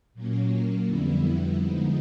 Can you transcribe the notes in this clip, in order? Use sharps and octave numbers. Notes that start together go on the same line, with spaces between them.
A#2 F#3 A#3 C#4
F2 D3 G3 B3 E4
D3 F3 G#3 B3 D#4